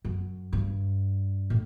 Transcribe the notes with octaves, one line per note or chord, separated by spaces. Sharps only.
F#2
G2
A2